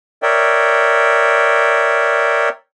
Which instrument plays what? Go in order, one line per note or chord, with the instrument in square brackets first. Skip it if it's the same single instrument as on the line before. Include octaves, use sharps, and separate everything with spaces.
[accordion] A#4 C#5 D5 E5 G5